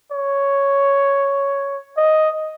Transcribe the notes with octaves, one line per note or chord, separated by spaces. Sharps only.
C#5
D#5